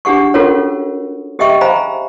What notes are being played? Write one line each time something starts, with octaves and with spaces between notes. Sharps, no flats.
D4 G4 G#4 F#5 C#6
C#4 F4 F#4 A4 A#4 C#5
G4 G#4 D#5 E5 G5 C#6
C5 F5 G#5 A#5 B5